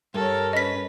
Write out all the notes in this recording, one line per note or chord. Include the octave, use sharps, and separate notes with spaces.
G2 A4 A#4 C#5
C#4 B4 D#5 B6